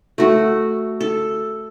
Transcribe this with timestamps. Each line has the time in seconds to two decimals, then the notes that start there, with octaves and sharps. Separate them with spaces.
0.18 A3 F#4
1.01 A4